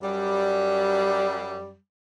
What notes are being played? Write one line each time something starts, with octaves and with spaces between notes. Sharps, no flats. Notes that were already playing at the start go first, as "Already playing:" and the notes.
F#2 G3